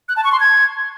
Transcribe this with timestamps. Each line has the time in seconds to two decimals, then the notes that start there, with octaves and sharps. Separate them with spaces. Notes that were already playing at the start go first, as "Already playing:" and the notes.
0.09 F#6
0.16 A5
0.24 C#6
0.32 C6
0.40 G#6